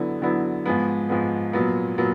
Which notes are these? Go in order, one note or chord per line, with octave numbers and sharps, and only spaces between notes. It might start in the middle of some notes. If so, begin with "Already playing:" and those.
Already playing: D3 F#3 B3 E4
D3 F#3 B3 E4
G#2 F3 G#3 B3
G#2 F3 G#3 B3
A#2 F#3 B3
A#2 F#3 B3